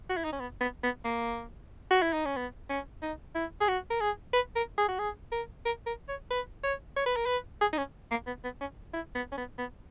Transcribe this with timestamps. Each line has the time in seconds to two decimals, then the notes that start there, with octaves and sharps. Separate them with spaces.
0.10 F#4
0.17 E4
0.24 D#4
0.32 C#4
0.40 B3
0.61 B3
0.83 B3
1.05 A#3
1.91 F#4
2.02 E4
2.13 D#4
2.25 C#4
2.36 B3
2.69 C#4
3.02 D#4
3.35 E4
3.60 G#4
3.68 F#4
3.90 A#4
4.00 G#4
4.33 B4
4.56 A#4
4.78 G#4
4.88 F#4
4.99 G#4
5.32 A#4
5.65 A#4
5.86 A#4
6.08 C#5
6.30 B4
6.63 C#5
6.96 C#5
7.06 B4
7.16 A#4
7.26 B4
7.61 G#4
7.73 D#4
7.77 C#4
8.11 A#3
8.27 B3
8.44 B3
8.61 C#4
8.93 E4
9.15 B3
9.32 C#4
9.37 B3
9.58 B3